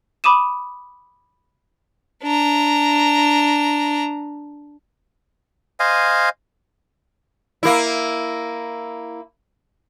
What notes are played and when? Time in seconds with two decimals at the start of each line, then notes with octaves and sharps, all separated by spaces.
0.24 B5 D6 D#6 D#7 E7
2.24 D4 A#5
5.80 C5 D#5 F5 G#5
7.63 A#3 E4